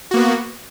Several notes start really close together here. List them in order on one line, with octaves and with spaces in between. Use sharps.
F#4 A#3 B3